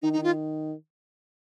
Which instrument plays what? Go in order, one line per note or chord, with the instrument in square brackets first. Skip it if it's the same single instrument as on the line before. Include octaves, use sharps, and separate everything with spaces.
[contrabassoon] D#3 [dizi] D#4
[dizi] D#4
[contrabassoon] D#3
[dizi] F4